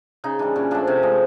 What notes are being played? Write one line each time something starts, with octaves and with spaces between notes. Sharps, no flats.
C#3 D#4
E3 G3 D4
A#2 C#4
F3 A3 D4
C3 C#4
F3 G#3